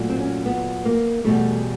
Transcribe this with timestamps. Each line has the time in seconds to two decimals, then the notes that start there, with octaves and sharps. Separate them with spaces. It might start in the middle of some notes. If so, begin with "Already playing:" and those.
Already playing: A#2 F#3 A3
0.09 C4
0.19 C#4
0.46 B3
0.85 A#3
1.24 E2 B2 G3 A3